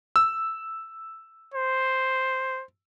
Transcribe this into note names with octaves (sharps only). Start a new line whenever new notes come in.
E6
C5